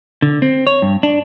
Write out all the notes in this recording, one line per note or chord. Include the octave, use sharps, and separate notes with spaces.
D3
C4
C#5
G2
D4